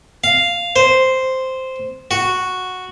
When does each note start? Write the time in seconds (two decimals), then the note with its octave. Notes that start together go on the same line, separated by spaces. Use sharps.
0.24 F5
0.76 C5
2.11 F#4